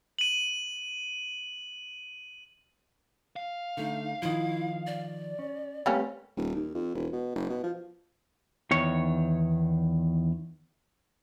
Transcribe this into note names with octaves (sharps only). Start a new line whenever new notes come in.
D#7 F#7
F5
D3 A3 D#4
D#3 F3 E4
D5
C#4
G3 A3 A#3 C4 C#4 B4
D#1
D#2
F2
E1
B2
F#1
B2
F3
E2 D#3 C#5